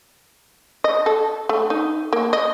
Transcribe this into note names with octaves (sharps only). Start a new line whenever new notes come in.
D#5
A4
A3
D#4
A#3
D#5